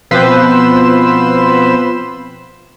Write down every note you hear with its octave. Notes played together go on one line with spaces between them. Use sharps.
B2 F3 C4 B4 C5 E6